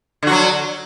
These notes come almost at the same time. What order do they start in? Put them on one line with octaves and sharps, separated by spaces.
D3 F#4 F#3